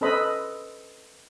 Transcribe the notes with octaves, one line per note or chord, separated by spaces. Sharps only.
C#4 A4 B4 C5 D#5 B5